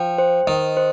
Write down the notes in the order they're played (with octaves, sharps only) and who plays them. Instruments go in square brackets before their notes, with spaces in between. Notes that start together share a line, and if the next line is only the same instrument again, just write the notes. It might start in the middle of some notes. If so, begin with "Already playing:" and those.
Already playing: [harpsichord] F3 [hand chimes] G5
[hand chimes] C5
[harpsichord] D#3 [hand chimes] D#5
[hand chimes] C5